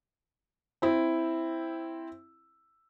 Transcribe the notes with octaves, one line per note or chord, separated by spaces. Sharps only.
C4 E4